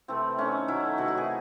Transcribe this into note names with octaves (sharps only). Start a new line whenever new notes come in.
C3 E3 A3 C4
D#3 A3 C#4
D#3 F#3 A3 E4
C3 E3 A3 F#4
F#4
G#4